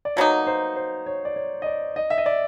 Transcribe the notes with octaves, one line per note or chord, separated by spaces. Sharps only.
D5
B2 F#3 A#3 D#4 C#5
C5
C5
C#5
D5
C#5
D#5
D5
D#5
E5
D#5
D5